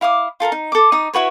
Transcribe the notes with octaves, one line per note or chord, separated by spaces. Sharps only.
E4 F5 D6 D#6
F4 A4 A#4 A#5
D#4
A4 D6
D#4 D#6
E4 F#4 B4 C#5